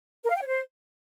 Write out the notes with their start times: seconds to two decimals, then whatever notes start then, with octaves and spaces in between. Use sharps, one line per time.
0.23 A#4
0.29 F5
0.35 G5
0.41 C#5
0.47 C5